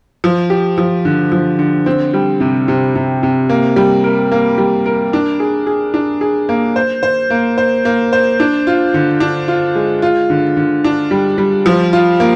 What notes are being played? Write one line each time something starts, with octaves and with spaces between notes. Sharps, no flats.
F3
G4
F3
D3
F3
D3
C4
G3
C3
C3
C3
C3
A#3
G3
A#4
A#3
G3
A#4
D4
G#4
G#4
D4
G#4
A#3
C5
C5
A#3
C5
A#3
C5
D4
F4
D3
D4
F4
G#3
F4
D3
D3
D4
G3
G3
F3
F4
A#3